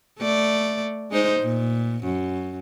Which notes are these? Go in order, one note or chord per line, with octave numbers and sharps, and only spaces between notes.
A3 D5
G#3 D#4 C5
A#2
F#2